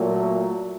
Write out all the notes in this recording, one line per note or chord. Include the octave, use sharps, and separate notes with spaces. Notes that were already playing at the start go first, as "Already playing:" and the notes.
Already playing: A#2 F#3 A3